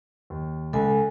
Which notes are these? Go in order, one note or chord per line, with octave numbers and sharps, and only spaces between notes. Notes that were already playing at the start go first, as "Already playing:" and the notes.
D#2
C#2 A4 G#5